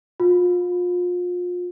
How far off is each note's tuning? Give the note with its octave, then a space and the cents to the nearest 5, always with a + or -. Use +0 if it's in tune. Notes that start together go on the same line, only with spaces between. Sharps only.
F4 +30